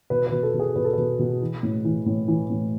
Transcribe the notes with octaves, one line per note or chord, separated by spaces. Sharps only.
B2 B4
B4
B2
A4
B2
G#4
B2 B4
A4
B2 B4
B2
E3
A2
E3
A2
E3
A2